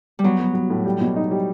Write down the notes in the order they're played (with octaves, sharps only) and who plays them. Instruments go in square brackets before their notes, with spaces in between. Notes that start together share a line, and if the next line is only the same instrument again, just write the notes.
[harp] G3
[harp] F#3 [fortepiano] B3
[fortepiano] B3
B3
A2
G3
B2
D#4
G3